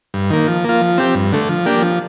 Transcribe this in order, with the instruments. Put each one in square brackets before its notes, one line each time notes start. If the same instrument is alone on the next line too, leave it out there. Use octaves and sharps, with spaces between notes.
[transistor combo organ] G2
D#3 A#3
F3
A#3 F4
F3
C4 G4
G2
D3 A3
F3
A#3 D4 G4
F3